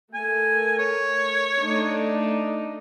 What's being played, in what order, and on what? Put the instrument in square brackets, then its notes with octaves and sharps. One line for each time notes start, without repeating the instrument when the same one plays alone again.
[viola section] A3 A#4 [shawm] G#5
[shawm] C#5
[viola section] A3 D4 D#4